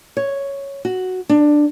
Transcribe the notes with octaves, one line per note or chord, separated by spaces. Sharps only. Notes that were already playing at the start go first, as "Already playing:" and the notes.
C#5
F#4
D4